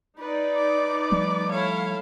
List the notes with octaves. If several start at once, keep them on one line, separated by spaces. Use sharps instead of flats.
D#4 B4 D5
D6
F3 G3 A3
E4 A4 C#5 F5